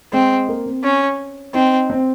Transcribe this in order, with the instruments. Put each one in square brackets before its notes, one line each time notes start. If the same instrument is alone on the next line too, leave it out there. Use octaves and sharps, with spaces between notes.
[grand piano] G#3 [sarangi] C4
[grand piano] A#3
C4
[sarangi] C#4
[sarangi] C4 [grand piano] D#4
[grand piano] C4